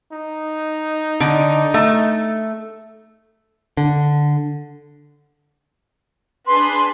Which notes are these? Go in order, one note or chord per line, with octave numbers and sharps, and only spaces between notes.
D#4
D3
A3
D3
D4 G#4 B4 C6